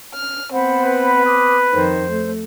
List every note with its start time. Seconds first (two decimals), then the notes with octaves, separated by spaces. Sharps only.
0.15 F6
0.52 B3 C4 C5 F#5 B5
0.83 B4
1.26 D6 D#6
1.72 F2 D#3 C5
2.10 A3